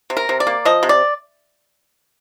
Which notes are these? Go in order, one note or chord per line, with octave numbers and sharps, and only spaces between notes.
C3
A#4
C3
D5
A#3
F3 D#5
C3
D5